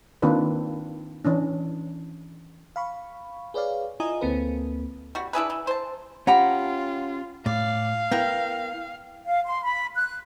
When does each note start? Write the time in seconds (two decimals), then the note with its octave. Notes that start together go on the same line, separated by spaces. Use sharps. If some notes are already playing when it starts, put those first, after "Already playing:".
0.22 D#3 A#3 C4 D4 F4 B4
1.25 E3 C#4 D4
2.76 F5 B5 C#6
3.54 G#4 B4 C#5 D5 F5
4.00 E4 F4 D#5 G#5 A#5 D#6
4.21 D2 A#3 C4 A4 B4
5.15 G3 F#4
5.33 D4 E4 G#4 B4
5.50 E3
5.67 C5 A5
6.27 C#4 F4 G4 F#5 A#5 B5
7.46 A2 D5 F5
8.12 B3 E4 A#4 G5
9.25 F5
9.45 C6
9.63 B5
9.95 F#6